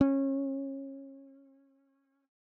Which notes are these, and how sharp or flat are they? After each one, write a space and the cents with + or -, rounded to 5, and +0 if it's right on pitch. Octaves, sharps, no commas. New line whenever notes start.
C#4 -25